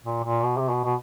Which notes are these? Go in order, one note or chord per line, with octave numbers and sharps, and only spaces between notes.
A#2
A#2
B2
C3
B2
B2